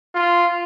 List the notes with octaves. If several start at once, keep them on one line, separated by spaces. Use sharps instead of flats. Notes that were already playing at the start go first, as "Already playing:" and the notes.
F4